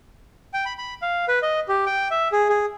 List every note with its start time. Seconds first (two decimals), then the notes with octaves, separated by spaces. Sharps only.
0.54 G5
0.66 B5
0.78 B5
1.02 F5
1.28 B4
1.43 D#5
1.69 G4
1.86 G5
2.11 E5
2.32 G#4
2.49 G#4